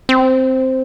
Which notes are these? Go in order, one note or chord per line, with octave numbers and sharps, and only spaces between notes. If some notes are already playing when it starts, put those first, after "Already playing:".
C4